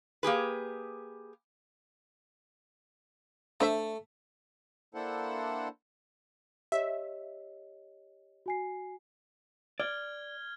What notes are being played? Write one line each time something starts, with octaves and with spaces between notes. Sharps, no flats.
A#3 G4 G#4 B4
A3 D4 C5 E5
A#3 D4 E4 A4 C5 F#5
G4 C#5 D#5 E5
F#4 G#5 C7
D5 F6 G#6 G7